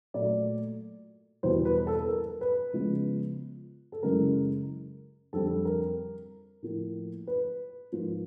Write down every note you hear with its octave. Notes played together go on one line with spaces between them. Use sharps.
A#2 F#3 A3 D5
E2 B2 G3 A#3 C5
B4
A4
A#4
B4
C#3 F3 G#3 B3
A4
F#2 C#3 E3 G#3 A#4
F2 D3 G3 A4
A#4
A2 F3 A#3
B4
G#2 F3 A#3